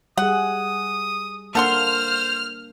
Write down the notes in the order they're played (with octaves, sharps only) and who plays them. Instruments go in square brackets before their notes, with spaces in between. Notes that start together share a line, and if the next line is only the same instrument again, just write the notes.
[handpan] G3 G#4 [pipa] F#5 [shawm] D#6
[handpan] A#3 D4 [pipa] A4 F#5 C6 [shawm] C5 [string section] F6